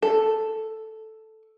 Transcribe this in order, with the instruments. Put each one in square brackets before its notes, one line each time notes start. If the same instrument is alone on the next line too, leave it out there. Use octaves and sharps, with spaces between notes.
[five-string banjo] A4